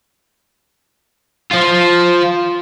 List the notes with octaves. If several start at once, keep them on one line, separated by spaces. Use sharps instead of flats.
F3 F4